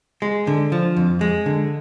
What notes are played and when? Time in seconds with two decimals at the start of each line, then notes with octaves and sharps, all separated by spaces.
0.22 G#3
0.47 D3
0.72 F3
0.97 F2
1.21 G#3
1.46 D3